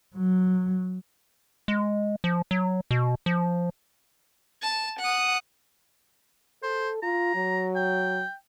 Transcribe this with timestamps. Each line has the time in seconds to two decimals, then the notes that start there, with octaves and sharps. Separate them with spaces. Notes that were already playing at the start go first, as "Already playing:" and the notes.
0.15 F#3
1.68 G#3
2.24 F3
2.51 F#3
2.91 B2
3.26 F3
4.62 A5
5.00 F#5 D#6
6.63 A4 C5
7.02 F4 A#5
7.35 F#3
7.76 G5